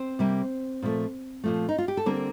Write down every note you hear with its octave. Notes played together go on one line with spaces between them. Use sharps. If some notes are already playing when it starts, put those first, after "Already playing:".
Already playing: C4 C5
C3 G3 A#3
A#2 F3 A3
A#2 F3 A3
D#4
F4
G4
A4
D3 G3 A#3 C4 A#4